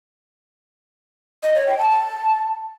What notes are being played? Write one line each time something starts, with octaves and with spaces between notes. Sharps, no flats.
D#5
C#5
G5
A5
A5